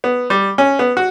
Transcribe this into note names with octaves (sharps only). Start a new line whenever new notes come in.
B3
G3
C#4
B3
F#4